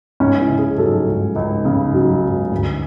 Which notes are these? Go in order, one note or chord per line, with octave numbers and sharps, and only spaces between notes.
C#2 C#4
E4
C#3
G#4
F#3 A4
C#2
C#2
C#3
F#3
C#2
D2